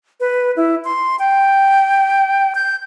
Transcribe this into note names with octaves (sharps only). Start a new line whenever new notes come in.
B4
E4
C6
G5
G6